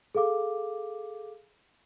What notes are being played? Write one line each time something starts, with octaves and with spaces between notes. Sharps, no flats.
G#4 A4 F5 D6